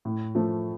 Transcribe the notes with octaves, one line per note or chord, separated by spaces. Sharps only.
A2
F3 A3